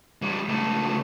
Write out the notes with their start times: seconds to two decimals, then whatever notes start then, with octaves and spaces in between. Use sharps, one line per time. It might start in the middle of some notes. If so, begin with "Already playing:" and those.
0.22 E3 G3
0.48 C#2 A3